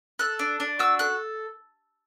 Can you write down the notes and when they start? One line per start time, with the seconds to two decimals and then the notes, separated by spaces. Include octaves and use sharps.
0.19 A4 F#6
0.39 D4
0.60 D4
0.79 F#4 E6
0.99 A4 F#6